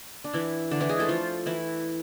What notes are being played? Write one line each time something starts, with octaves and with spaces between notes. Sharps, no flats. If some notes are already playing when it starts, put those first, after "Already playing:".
D4
E3 E4
D3 D4
E3 E4
G#3 G#4
A3 A4
F3 F4
E3 E4